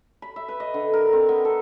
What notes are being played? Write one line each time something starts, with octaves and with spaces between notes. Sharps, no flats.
B5
E5
B4
D#5
D3
A#4
C4
B3
A4